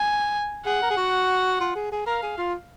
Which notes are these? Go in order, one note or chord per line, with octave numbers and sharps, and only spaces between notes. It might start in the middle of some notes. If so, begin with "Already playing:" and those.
Already playing: G#5
G#4 F#5
A#4
G#4
F#4
F4
G#4
G#4
A#4 F5
G#4
F4